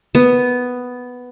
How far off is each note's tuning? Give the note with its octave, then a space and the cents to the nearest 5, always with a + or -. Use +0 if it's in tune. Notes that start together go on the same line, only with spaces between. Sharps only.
B3 +5